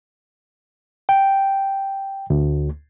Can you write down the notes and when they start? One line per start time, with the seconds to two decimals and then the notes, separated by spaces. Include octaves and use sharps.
1.09 G5
2.30 D2